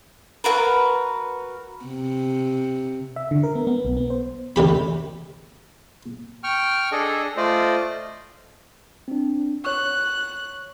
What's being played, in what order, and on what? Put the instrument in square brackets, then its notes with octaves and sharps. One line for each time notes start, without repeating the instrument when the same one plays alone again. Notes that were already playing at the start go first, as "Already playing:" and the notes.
[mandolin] F#4 A#4 B4
[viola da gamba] C3
[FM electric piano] E5
D3
A#4
B3
B3
B1
B3
C5
[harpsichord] D2 C3 G4 B5
[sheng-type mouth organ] G5 C#6 F6
D4 G#4 A4 D#5
A3 F4 C5 D5 D#5
[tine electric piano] C4 D4
[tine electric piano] C#5 C#6 [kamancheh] F#6